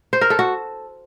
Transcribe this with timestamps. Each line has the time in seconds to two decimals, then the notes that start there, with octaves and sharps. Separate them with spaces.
0.13 C5
0.21 A#4
0.30 A4
0.39 F#4